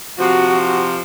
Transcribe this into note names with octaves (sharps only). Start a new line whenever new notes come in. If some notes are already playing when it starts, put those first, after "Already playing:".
F2 C3 F3 F#4